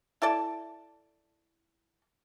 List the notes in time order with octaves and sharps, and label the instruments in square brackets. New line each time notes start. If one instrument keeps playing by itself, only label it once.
[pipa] E4 A4 D5 A5